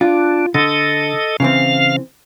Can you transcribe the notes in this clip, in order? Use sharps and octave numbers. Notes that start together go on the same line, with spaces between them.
D4 F4
D3 A4 D#5
C#3 E3 C4 F5